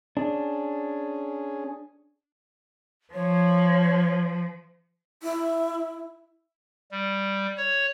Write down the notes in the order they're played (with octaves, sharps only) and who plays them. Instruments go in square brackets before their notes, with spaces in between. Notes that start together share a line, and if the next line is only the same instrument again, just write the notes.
[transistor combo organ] C#4 G#4 [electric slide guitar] D4
[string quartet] F3 [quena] C#5
[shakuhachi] E4
[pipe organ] G3
C#5